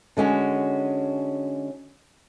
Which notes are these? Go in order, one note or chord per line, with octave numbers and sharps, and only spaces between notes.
D3 G#3 C#4 F#4